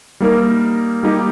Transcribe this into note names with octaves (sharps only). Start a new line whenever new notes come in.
G3 A#3 D#4 A#4
G3 A#3 D#4 G4